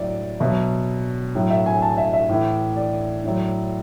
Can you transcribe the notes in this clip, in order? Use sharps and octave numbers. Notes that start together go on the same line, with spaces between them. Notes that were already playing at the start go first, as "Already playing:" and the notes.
Already playing: A2 F#3 D5
B2 F#3 E5
A2 F#3
E5
G#5
A5
E5
E5
A2 E3
D5
A2 F#3